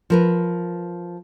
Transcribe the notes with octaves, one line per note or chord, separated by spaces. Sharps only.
F3 A#4 B4